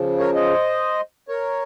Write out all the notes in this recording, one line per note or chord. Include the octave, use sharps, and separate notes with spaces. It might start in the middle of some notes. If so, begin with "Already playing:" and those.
Already playing: C#3 F3
A#4 C#5
C5 D#5
A#4 C#5